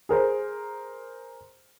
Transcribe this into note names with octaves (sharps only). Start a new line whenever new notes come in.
G#4 A#4 C5